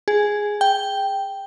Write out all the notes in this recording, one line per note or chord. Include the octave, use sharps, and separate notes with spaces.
G#4
G5